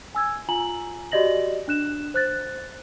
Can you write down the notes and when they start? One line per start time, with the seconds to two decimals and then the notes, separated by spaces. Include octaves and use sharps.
0.15 G#5 E6 G#6
0.49 F4 G#5 A#5 F#7
1.12 F#4 G4 D5 D#5 A#6 F#7
1.68 D4 F#6 E7
2.14 C5 F#6 A6